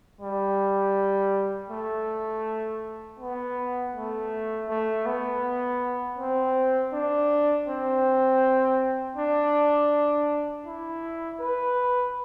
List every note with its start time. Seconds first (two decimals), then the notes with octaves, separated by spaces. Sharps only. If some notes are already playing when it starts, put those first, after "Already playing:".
0.21 G3
1.70 A3
3.19 B3
3.95 A3
4.69 A3
5.06 B3
6.19 C4
6.93 D4
7.68 C4
9.17 D4
10.66 E4
11.40 B4